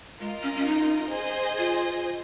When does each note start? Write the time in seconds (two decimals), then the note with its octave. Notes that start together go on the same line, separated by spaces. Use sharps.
0.20 G#3 F4 A#4 D#5
0.43 C#4
0.55 C#4
0.66 D#4
1.12 G#4 C5 D#5 G#5
1.58 F4